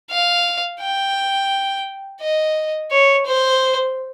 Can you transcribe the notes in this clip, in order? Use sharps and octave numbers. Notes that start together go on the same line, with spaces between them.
F5
G5
D#5
C#5
C5